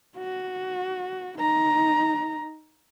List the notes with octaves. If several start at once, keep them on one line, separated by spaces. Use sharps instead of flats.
F#4
D#4 A#5